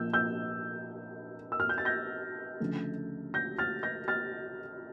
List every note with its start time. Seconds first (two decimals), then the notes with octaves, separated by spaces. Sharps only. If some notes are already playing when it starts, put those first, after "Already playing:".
Already playing: A#2 F3 A#3 E6 G6
0.13 E6 G6
1.52 E6
1.60 F6
1.69 G6
1.78 A6
1.85 G6 A#6
2.60 D2 C#3 F3 A3
3.34 G6 A#6
3.58 F6 A6
3.83 G6 A#6
4.08 F6 A6